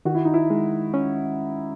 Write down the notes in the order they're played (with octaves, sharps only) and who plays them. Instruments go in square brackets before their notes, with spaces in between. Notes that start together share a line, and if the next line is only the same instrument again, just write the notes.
[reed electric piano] D#3 [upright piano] F#4
[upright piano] E4
D#4
E4
[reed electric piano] G#3
C#4